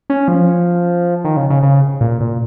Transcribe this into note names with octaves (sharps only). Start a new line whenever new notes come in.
C#4
F3
D#3
C#3
C#3
C#3
A#2
A#2